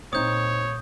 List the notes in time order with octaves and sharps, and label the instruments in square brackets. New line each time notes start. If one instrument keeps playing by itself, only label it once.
[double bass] A#2 [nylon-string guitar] C4 D#4 [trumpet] C#5 [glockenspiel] D#6 G6